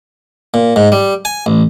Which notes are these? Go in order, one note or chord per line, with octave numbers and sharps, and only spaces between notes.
A#2
G#2
G3
G#5
A1